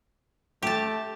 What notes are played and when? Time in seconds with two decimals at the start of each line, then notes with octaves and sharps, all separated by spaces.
0.63 A3 G4 A5